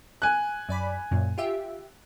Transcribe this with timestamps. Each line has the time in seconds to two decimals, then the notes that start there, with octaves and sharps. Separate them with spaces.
0.22 G#5 F#6
0.69 F#2 D5 B5
1.11 F#2 A#2
1.38 F4 G4 E5